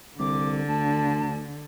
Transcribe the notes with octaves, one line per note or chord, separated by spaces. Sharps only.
C2 D3 D6
D2 A5